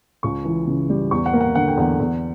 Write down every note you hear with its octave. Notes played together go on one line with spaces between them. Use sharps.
C#2 C#6
E3
C#3
G3
E2 C#6
F#5
A#3
F#5
D3 F#5
G5
E2 F#5
E2